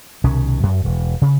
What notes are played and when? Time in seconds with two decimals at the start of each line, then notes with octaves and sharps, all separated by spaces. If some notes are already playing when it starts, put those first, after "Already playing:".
0.24 C2 B2 D#3 C#4
0.63 F#2
0.85 E1
1.22 C#3